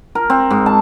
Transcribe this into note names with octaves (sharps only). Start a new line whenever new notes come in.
A#4
C4
G#2
A5